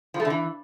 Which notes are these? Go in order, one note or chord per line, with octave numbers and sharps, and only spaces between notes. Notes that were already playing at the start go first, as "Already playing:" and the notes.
F3
A3
D3
E3